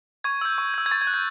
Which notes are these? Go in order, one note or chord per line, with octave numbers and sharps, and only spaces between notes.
C#6 G#6
E6 G6
C#6
E6 G6
G#6
C#6 A6
G#6
F#6
G6